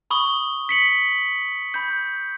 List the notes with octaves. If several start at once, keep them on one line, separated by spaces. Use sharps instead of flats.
B5 C#6 D#6 G7
B6 C#7 F#7
B5 G6